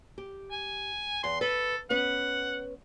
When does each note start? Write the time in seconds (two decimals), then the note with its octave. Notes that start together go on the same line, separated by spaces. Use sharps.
0.18 G4
0.51 G#5
1.24 E2 C6
1.41 A4 B4
1.90 B3 C#4 B4 F#5